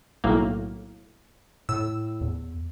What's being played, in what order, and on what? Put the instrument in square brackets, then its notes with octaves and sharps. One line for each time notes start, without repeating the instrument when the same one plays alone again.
[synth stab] B1 A2 A#3
[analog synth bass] A2 [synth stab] E6
[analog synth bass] E2